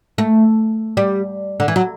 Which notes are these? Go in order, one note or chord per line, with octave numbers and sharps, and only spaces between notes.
A3
G3
D3
E3
F#3